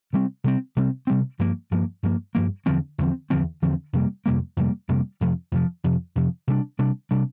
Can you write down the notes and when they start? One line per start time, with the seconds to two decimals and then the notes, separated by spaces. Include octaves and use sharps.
0.13 C3 G3 C4
0.44 C3 G3 C4
0.77 C3 G3 C4
1.07 C3 G3 C4
1.39 G2 F3 A#3
1.71 G2 F3 A#3
2.03 G2 F3 A#3
2.35 G2 F3 A#3
2.66 E2 D3 F3 C4
2.98 E2 D3 F3 C4
3.30 E2 D3 F3 C4
3.62 E2 D3 F3 C4
3.93 F2 C3 G3 A#3
4.26 F2 C3 G3 A#3
4.57 F2 C3 G3 A#3
4.89 F2 C3 G3 A#3
5.21 F2 C3 F3
5.52 F2 C3 F3
5.84 F2 C3 F3
6.16 F2 C3 F3
6.48 C3 G3 D4
6.79 C3 G3 D4
7.11 C3 G3 D4